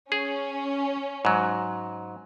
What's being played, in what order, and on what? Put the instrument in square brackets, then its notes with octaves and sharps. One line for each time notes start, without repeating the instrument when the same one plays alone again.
[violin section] C#4 [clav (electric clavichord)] G#4
[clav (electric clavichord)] G#2 F#3